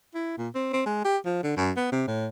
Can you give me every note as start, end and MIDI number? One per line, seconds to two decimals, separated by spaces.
0.14 0.34 64
0.38 0.48 46
0.55 0.70 60
0.73 0.82 60
0.86 1.00 56
1.05 1.17 67
1.25 1.41 53
1.43 1.54 50
1.57 1.71 42
1.77 1.90 59
1.92 2.04 48
2.07 2.28 45